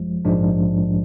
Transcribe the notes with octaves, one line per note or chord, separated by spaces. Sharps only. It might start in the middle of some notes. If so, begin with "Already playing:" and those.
Already playing: G#1 F#2 F3 G#3
A#1 G#2 F3 G#3 D4